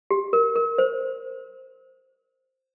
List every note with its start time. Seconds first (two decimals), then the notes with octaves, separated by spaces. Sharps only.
0.11 G4
0.33 A#4
0.56 A#4
0.78 C5